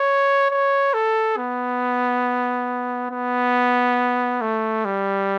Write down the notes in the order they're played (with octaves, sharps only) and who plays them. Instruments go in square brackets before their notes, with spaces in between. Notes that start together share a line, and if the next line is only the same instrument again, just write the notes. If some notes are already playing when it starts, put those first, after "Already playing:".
Already playing: [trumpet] C#5
C#5
A4
B3
B3
A3
G3